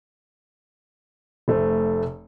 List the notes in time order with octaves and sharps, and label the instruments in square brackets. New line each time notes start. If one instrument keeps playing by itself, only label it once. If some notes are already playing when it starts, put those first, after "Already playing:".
[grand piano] F1 A3 C5